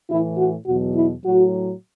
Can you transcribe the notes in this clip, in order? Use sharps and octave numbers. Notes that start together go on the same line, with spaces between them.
A2 E3 E4
F#4
E2 B2 F#3 F#4
E4
A2 F#3 F#4